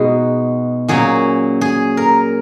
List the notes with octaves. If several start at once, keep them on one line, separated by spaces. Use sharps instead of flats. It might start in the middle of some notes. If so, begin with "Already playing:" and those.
Already playing: B2 G#3 B3 D#4 G#4
A#2 F#3 C#4 G#4
G#4
A#4